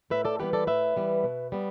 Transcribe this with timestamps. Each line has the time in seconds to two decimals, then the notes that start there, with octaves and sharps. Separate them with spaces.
0.10 A2 B4 E5
0.25 A4 D5
0.39 E3 G3 B3 G4 B4
0.53 A4 D5
0.67 A2 B4 E5
0.96 E3 G3 B3
1.24 B2
1.52 G3 B3